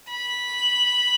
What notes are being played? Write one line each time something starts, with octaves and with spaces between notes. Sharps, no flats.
B5